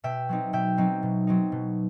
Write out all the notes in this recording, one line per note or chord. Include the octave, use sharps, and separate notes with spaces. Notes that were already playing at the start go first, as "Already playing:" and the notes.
B2 E5 G5
F#3 C4 D#4
B2 E5 G5
F#3 C4 D#4
B2
F#3 C4 D#4
B2